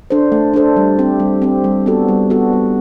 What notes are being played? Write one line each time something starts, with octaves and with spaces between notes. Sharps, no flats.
D4 A4 C5
A3
D4 A4 C5
G3
C4 G4
G3
C4 G4
G3
B3 F#4 A4
G3
B3 F#4 A4
G3